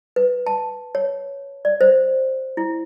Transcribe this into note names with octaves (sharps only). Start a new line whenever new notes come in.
B4
A5
C#5
D5
C5
E4